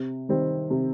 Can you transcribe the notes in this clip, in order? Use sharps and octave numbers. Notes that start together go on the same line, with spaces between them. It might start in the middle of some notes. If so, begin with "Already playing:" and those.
Already playing: C3
D#3 G3 C4
C3